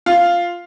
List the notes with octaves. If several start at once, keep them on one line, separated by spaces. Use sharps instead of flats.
F4